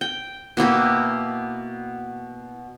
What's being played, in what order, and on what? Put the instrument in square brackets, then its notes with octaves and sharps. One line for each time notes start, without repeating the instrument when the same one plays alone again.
[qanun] G5
B2 A#3 E4 G4